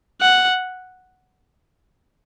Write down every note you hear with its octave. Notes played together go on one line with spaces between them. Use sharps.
F#5